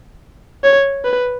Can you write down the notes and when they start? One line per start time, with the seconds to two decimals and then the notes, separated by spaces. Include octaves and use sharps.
0.64 C#5
1.05 B4